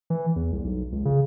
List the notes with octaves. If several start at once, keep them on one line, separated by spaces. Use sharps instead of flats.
E3
E2
C2
B1
C#2
C#3